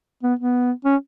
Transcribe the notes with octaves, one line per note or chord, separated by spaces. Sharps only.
B3
B3
C#4